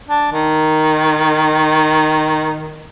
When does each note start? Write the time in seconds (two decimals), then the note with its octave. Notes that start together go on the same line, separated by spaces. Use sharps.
0.09 D4
0.32 D#3